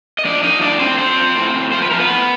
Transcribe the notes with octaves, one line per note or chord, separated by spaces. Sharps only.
D#5
F3 D4 D5
F3 D#4 D#5
A2 D4 D5
A2 C4 C5
F3 C4 C5
F3
A2
A2
F3 C5
B4
F3 A#4
B3 B4
A2